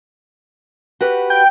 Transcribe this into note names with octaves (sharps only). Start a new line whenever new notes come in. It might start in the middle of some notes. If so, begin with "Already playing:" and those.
F#4 G4 B4
G5